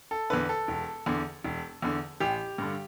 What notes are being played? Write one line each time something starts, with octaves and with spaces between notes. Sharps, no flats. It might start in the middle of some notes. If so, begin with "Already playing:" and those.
A4
E2 D3 B4
A4
E1
E2 D3
E1
E2 D3
A1 G4
G2 D3